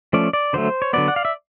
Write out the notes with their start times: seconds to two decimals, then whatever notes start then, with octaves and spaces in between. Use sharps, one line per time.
0.13 F3 A3 C#4 D5
0.33 D5
0.53 D3 F#3 A3 C5
0.82 C#5
0.93 D3 F#3 B3 D5
1.08 F#5
1.16 F5
1.25 E5